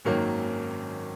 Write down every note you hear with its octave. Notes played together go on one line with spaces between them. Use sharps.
G#1 F#2 D#3 F#3 A#3